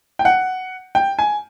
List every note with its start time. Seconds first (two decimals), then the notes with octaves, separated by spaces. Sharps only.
0.19 G5
0.25 F#5
0.95 G5
1.19 G#5